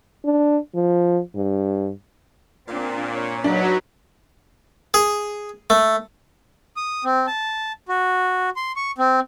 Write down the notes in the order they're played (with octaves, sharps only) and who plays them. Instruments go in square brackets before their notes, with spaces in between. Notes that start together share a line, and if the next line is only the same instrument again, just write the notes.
[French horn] D4
F3
G2
[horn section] A#2 [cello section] C4 D4
[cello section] C#5
[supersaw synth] F#3 [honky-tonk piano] D4 [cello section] D#4 B4
[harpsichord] G#4
A3
[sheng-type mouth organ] D#6
C4
A5
F#4
C6
C#6
C4